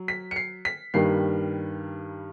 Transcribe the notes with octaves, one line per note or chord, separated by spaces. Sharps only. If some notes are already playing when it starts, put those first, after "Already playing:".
Already playing: F#3
B6
C#7
C7
B6
G2 D#3 G3 A#3 C7